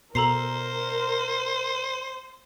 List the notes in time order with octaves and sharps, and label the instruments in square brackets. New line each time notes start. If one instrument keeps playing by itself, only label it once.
[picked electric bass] B2 [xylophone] A4 A#5 C7 [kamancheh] A#4 [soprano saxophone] C5